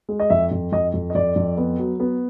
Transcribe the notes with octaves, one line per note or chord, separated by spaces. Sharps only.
G#3
D#5
F2 E5
F2
F2 D#5
F2
D#5
F2 D5
F2
B3
F#3
B3